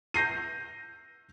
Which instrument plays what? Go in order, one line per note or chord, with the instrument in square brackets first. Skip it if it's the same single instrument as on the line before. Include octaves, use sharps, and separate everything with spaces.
[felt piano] G6 A#6 C7 D#7